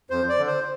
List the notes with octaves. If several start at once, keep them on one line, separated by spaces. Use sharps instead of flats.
F2 C5
D5
D3
C5